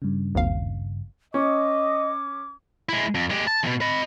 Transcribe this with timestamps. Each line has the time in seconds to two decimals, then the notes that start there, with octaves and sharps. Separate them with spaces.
0.02 G2 C#3
0.35 G#1 D#2 F5
1.34 C#4 D#5 D6
2.89 G#3 E4
3.15 F2
3.30 G#3 G4
3.47 A5
3.64 E2 B2
3.81 D#5 B5